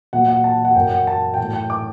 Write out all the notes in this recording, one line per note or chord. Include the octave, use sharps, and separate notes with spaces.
A#2 F#3 F#5
F#5
A5
F#5
F#2 F#3 G5
F#5
A5
G5
A2 F#3 A5
G5
D6